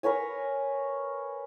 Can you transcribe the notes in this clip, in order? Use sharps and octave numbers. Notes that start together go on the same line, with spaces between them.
A#4 B4 C#5 G#5